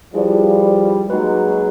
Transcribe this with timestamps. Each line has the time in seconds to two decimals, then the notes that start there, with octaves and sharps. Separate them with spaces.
0.14 F3 G3 E4 G#4 B4 D5
1.09 F#3 G#3 A#3 D#4 F#4 B4